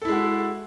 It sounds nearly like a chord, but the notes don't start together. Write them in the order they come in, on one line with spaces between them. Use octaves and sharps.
A4 E4 G#3 F#4